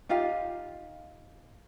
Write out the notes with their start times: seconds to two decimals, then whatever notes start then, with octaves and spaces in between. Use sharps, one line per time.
0.09 D#4 F4 G4 F5